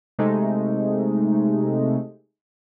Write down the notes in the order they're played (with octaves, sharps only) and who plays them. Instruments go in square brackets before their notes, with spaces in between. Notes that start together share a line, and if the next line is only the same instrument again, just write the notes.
[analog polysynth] C3 G#3 A3 D#4